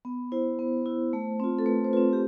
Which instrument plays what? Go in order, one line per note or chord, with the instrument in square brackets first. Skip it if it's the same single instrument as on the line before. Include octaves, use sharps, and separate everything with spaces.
[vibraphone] B3
E4 C5
B3
E4
A3
C4 F4
A4
A3 B4
C5
C4 F4 B4
G4